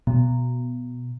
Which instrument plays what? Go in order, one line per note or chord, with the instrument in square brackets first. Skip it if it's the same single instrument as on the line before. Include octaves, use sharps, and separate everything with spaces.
[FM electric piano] B2